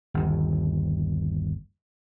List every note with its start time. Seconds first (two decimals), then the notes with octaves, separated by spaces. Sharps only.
0.14 G1 D#2